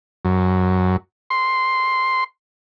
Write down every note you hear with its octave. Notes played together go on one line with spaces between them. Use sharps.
F#2
C6